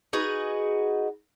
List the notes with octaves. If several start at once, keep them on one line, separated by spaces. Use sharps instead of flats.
D#4 F#4 G#4 B4